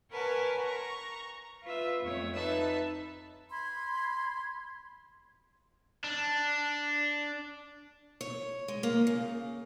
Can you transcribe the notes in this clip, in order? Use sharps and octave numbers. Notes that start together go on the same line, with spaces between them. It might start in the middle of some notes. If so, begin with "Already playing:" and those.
A#4 B4 C#5 F#5 G#5 A5
A#5 C#6
F4 B4 E5
F2 A3 C#5
D#4 B4 E5 A5
B5 C6 G#6
D4
C#5
G#3
A#3
C#3